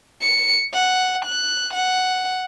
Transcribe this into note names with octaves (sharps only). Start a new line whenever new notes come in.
C#7
F#5
F#6
F#5